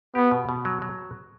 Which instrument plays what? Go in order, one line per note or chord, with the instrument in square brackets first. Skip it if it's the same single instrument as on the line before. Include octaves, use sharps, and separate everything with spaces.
[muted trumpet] B3 [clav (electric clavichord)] G4
[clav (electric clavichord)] B2
B2
F#3
F#3